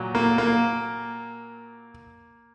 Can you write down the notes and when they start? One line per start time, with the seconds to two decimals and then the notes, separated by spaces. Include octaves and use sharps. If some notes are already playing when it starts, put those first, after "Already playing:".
Already playing: A#2 F#3
0.15 A#3
0.38 A#3